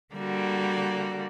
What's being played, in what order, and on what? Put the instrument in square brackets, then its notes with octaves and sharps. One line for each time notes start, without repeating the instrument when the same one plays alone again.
[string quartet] D3 G3 A#3 F#4